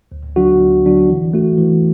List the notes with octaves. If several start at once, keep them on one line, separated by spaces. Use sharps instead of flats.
D2
D3 F#3 D4 F#4
D2
D3 F#3 D4 F#4
E3
A3 F#4
E3